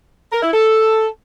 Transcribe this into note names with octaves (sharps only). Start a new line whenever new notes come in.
A#4
E4
A4